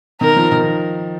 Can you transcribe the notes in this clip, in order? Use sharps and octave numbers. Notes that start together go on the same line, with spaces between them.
D#3 A#4
F3
D#3